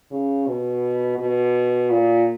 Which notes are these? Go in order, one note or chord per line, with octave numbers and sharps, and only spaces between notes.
C#3
B2
B2
A#2